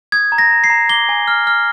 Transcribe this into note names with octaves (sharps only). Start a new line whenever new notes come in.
D#6 G#6
A#5
A#6
A#5
C7
A#5
D6 G7
G#5
F6
F6